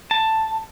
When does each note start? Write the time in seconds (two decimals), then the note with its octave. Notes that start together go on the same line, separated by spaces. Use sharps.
0.11 A5